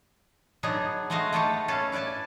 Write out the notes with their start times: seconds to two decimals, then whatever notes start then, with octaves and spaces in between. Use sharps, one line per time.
0.63 F#3 B3 D4 D#4 G#4
1.10 G#3 A3 F#4 D#5 F5
1.33 A3 G4 A4 B4 F5 F#5
1.68 C#4 A4 B4 F5 A5
1.92 E4 B4 D5 G#5 A5